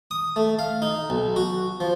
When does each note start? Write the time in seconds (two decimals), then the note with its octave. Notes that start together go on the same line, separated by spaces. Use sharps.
0.11 D#6
0.36 A3
0.59 F5
0.82 D#4
1.10 B1
1.36 F#4
1.80 F3